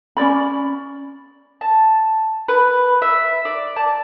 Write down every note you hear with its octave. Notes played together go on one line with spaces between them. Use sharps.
C#4 D#4 D5 B5
A5
B4
E5
D5
A5